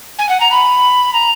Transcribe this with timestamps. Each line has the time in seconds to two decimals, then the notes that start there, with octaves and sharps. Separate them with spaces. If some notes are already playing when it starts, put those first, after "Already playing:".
0.18 G#5
0.28 F#5
0.40 A#5
0.51 B5
1.13 A#5